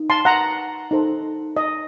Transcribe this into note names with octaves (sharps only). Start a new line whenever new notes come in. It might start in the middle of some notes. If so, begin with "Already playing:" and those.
Already playing: D#4
A5 C6
F#5 A#5
D#4 A4 C5
D#5